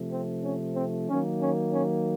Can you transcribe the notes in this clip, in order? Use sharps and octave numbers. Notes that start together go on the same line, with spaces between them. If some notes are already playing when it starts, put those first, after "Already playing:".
Already playing: C3 F3 A3
C4
C#4
C4
D#3 F#3 A#3 C#4
C#4
C#4